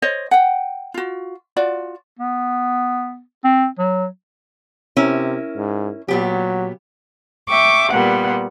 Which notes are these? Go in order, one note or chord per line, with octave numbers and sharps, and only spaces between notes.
C5 C#5 D#5
F#5 G5
F4 F#4
F4 F#4 D5
B3
C4
F#3
C3 C#4 E4 A#4
G#2
A#2 F#3 B3 G4
E5 G5 C#6 D6
A#2 G3 B3 F#5